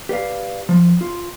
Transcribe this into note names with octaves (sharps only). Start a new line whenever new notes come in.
G4 B4 D5 F5
F3
F4